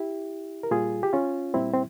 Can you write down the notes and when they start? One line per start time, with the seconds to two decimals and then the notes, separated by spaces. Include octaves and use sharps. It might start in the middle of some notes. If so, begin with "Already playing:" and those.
Already playing: E4 G4
0.63 A#4
0.71 A#2 G3 F4 G#4
1.03 G4
1.13 C#4 F4
1.54 A#2 G3 C4 E4
1.74 C4